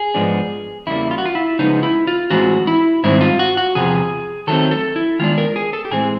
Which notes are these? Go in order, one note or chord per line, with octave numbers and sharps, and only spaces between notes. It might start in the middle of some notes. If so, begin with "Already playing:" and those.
Already playing: G#4
G#2 F3 G#3 B3 D4
E2 C#3 G3 A#3 E4
F4
F#4
F4
E4
C#3 F3 G#3 B3 D#4
E4
F4
A2 E3 G#3 C4 F#4
E4
G#2 D#3 G3 C4 E4
F4
F#4
F#4
E2 C3 F3 G#4
D#3 F#3 A3 C4 A4
A4
E4
D#3 G#3 B3 D4 F4
A#4
G#4
A4
G4
A2 E3 G#3 C4 G#4